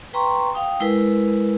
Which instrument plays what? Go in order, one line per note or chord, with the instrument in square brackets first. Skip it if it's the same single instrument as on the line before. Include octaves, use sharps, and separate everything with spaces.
[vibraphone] B4 G5 A#5 C6 C#6
F5 G5 D#6
G#3 E4 A#4 B4